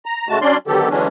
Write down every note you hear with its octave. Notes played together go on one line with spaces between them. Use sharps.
A#5
C#3 G#3 A3 F#4 A5
F#3 C#4 D4 D5 C6
D3 D#3 F#3 B3 G4 A4
D3 E3 F#3 G#3 C#4 D4